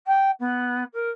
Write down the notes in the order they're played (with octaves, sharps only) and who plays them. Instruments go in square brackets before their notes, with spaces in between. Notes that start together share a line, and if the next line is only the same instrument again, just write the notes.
[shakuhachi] G5
B3
A#4